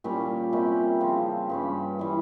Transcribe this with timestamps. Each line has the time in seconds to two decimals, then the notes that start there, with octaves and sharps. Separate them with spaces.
0.04 A#2 G3 A#3 C#4
0.53 C3 G3 A#3 C#4
1.00 C#3 F3 C4
1.50 G2 G3 C#4
1.99 E3 G3